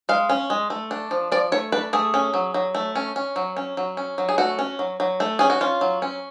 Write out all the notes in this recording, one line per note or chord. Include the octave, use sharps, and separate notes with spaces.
G#3 F5
C#4
G#3
A3
D4
F3
F3 D5
A3 C#5
D4 B4
A3 G#4
C#4
F#3
F#3
A3
C#4
C#4
F#3
C#4
F#3
C#4
F#3
G#4
A3 F#4
C#4
F#3
F#3
A3
C#4 G#4
F#4
C#4 F4
F#3
C#4